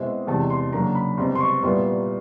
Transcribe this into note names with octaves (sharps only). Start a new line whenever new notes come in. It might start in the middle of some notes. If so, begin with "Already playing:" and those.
Already playing: B2 G#3 C4 E4
E2 C3 E3 G#3 A5
C6
C#3 F#3 A#3 D4 A#5
B5
C2 B2 G#3 C4 C6
C6
C#6
A#2 G3 B3 E4 C6